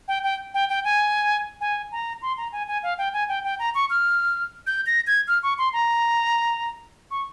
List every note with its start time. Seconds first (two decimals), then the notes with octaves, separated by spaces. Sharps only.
0.08 G5
0.24 G5
0.54 G5
0.69 G5
0.84 G#5
1.61 G#5
1.92 A#5
2.22 C6
2.37 A#5
2.52 G#5
2.68 G#5
2.83 F5
2.98 G5
3.13 G#5
3.29 G5
3.44 G5
3.59 A#5
3.75 C#6
3.90 F6
4.67 G6
4.86 A#6
5.07 G#6
5.28 F6
5.43 C#6
5.58 C6
5.73 A#5
7.11 C#6